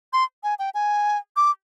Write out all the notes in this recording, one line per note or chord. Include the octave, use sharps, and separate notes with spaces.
C6
G#5
G5
G#5
D6